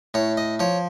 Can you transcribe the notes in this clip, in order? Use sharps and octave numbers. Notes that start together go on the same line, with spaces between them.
A2 C#5
D#5
F3 C#5